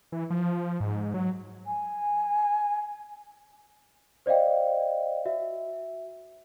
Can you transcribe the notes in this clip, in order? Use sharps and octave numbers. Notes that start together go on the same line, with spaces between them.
E3
F3
G#2
F#3
G#5
C5 D5 D#5 F5 G5
F#4 E5